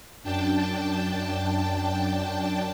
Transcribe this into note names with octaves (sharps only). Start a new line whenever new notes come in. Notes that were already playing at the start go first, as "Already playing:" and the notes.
F#2 D4 G5 A5